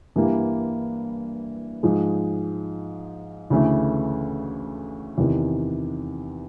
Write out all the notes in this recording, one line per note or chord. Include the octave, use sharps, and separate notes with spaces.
G2 E3 G3 A#3
G#2 F3 G#3
D2 C#3 E3 A3
E2 C3 D#3